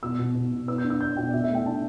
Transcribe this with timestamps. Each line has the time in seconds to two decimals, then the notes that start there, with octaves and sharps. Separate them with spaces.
0.03 B2 E6
0.19 B2
0.35 B2
0.52 B2
0.68 B3 E6
0.78 G6
0.84 D4
0.90 E6
1.00 B3 G6
1.17 B2 G5
1.27 D5
1.33 B2 E5
1.44 E5
1.50 A3 G5
1.65 D4 A5